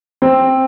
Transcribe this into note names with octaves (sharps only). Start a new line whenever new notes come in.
C4